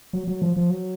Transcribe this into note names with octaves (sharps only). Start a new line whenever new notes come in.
F#3
F#3
F3
F3
F#3